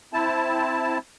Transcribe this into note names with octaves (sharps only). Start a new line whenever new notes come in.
C4 E4 A5